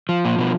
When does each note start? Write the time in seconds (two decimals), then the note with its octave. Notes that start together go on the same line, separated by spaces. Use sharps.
0.09 F3
0.25 A#2
0.39 B2